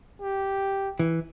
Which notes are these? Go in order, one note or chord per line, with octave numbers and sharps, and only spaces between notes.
G4
E3